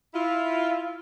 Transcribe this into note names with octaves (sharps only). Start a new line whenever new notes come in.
E4 F4